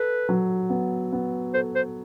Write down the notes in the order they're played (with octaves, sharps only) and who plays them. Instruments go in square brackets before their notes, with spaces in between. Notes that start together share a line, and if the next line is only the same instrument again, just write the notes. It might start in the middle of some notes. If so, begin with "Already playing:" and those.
Already playing: [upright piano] A4 [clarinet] B4
[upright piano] F#3
B3
B3
[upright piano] A4 [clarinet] C5
[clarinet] C5